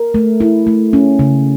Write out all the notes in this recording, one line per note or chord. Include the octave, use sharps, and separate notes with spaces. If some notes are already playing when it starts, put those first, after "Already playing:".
Already playing: A#4
A3
E4
A3
C#4
C#3